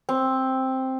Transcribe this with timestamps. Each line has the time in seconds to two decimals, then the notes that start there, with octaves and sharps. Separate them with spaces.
0.09 C4